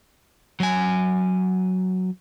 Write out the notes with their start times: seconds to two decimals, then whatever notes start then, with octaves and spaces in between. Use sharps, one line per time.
0.60 F#3 G#5